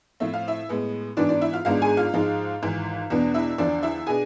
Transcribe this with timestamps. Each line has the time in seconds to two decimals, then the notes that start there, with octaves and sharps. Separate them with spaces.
0.20 A2 F3 A3 C4 E5
0.34 F5
0.47 E4 E5
0.69 A2 G#3 B3
1.17 G#2 E3 B3 D4 D5
1.29 D4 D5
1.41 E4 E5
1.53 F4 F5
1.65 G#1 G#2 G#3 B3 D4 F4 F5
1.82 G#4 G#5
1.97 F4 F5
2.14 G#2 F3 G#3
2.62 G#1 G#2 E3
3.10 E2 B2 B3 D4
3.34 E4 E5
3.58 E2 D3 F3 D4 D5
3.83 E4 E5
4.07 B2 B3 D4 G#4 G#5